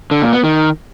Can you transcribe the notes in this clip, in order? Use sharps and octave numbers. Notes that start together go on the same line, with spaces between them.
D3
A#2
B3
D#3